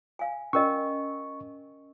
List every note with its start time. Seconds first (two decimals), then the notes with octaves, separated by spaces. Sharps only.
0.19 F5 G#5
0.53 C#4 A#4 D#5 C#6